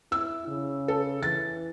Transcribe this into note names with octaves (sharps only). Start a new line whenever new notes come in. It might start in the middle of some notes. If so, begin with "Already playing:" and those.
E4 E6
C#3
A4
E3 A6